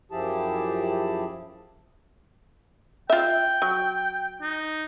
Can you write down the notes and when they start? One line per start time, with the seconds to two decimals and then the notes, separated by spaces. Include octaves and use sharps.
0.11 F#2 F3 E4 G4 G#4 A5
3.10 F4 E5 G5
3.62 F#3
4.42 D#4